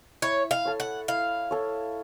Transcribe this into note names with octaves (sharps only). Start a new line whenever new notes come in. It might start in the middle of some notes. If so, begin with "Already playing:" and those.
E4 C#5
F5
A4 C#5
F#5
E4 F5
A4 C#5